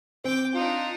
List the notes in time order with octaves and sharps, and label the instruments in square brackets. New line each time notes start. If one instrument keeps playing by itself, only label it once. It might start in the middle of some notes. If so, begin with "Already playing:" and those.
[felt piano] C4 [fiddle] G5 D6
[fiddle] D4 D#4 [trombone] F4